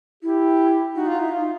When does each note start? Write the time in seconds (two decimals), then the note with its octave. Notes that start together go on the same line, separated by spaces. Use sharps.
0.23 E4 G4
0.96 D#4 F#4
1.08 F4
1.20 E4
1.32 F4